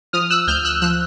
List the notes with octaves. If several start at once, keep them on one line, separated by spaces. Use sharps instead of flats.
F3 D#6 F6
E6 F#6
D2 F6 G6
E6 F#6
F3 E6 F#6